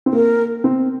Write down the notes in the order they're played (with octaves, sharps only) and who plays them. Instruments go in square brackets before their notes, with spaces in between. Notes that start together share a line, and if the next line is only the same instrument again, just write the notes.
[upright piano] C4
[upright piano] A#3 [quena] A#4
[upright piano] C4